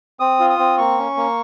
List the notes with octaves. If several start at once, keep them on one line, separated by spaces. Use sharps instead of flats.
C4 D#6
F4
D#6
C4
A#3 C#6
C#4
A#3